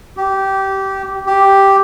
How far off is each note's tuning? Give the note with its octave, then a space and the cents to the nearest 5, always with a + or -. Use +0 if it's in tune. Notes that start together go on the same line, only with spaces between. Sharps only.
G4 -15
G4 +0